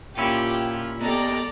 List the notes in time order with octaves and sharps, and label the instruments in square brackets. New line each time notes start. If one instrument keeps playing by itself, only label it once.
[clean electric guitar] A#2 C#4 E4 [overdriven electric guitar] F4 [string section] G4
[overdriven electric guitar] G#3 G4 [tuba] B3 [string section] A4 D5 A#5